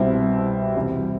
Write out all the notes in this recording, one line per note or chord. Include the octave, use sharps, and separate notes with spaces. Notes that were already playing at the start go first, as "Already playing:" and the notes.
Already playing: C2 B2 G3 C4 E4
E2 C3 G3